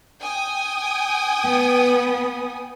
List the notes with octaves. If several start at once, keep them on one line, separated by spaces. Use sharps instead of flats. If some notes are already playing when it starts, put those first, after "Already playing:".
G5 G#5 D#6
B3